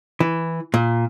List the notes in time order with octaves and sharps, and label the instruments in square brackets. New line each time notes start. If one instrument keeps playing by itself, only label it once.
[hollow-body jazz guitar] E3
A#2